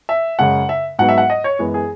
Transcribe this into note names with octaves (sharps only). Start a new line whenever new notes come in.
E5
F#2 C#3 G#3 F#5
E5
G#2 F#3 B3 F#5
E5
F#5
D#5
C#5
F#2 E3 G#3 B3
G#4